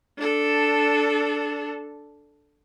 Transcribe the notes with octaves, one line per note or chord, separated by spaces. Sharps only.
D4 A4